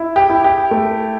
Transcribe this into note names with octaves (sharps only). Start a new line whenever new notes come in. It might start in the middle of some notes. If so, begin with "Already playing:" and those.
Already playing: E4
G4
E4
G4
A3